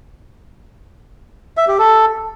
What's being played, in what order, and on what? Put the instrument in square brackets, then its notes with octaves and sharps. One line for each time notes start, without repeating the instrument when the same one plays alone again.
[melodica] E5
G4
A4